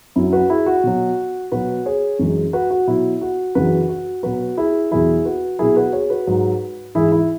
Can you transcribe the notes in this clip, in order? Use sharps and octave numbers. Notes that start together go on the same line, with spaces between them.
F#2 F#3 E4
F#4 B4
E4 G#4
F#4
B2 F#3
B2 F#3 F#4 B4
G#4 C#5
F#2 E3 G#3
F#4 B4
F#4
B2 F#3 E4
F#4
F#2 C#3 E3 F#4 B4
F#4
B2 F#3 F#4 B4
E4 G#4
E2 B2 F#3 E4 G#4
F#4 B4
B2 F#3 E4 G#4
F#4 B4
G#4 C#5
F#4 B4
G#2 F#3
G#2 E3 G#3 E4 G#4
E4